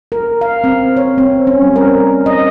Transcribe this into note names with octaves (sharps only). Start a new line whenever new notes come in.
A#4
F5
C4
C#5
C4
C#4
G3
A#4
D#5